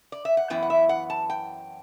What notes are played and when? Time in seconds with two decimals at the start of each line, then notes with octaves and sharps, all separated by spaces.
0.12 D5
0.25 E5
0.37 F#5
0.50 F#2 E3 B3 E4 G5
0.63 F#5
0.70 E5
0.89 F#5
1.10 A5
1.30 G5